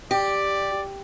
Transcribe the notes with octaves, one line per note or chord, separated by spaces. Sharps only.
G4 D5